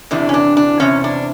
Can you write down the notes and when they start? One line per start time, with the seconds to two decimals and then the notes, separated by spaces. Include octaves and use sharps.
0.11 E2 C3 E3 D4
0.29 C#4
0.34 D4
0.57 D4
0.80 E2 C3 C#4
1.04 D4